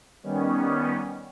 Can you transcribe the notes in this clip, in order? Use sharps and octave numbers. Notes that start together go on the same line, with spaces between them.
D#3 G3 B3 C#4